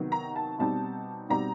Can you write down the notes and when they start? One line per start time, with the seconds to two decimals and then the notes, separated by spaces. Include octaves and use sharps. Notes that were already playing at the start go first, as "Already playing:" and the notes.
Already playing: C3 D#3 F#3 B3 D#4
0.12 A#5
0.36 A5
0.59 B2 G3 C4 D#4 A5
1.29 B2 G3 C4 D#4 A#5